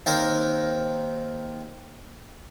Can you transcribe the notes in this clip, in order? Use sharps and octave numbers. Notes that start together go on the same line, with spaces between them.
D#2 C4 A#4 C5 A#5